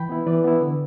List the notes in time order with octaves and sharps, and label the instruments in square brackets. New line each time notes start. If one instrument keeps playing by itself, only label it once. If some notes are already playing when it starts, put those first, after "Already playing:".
Already playing: [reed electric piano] E3 G5 B5
B3 E4
E3 B4 D5
B3 E4
D3